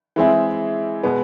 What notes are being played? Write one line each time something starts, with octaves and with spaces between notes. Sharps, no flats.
E3 G#3 C4 E4 G#4
B2 G#3 B3